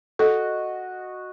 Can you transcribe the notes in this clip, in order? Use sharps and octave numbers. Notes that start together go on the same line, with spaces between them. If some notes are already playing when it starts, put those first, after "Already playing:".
F#4 A4 D#5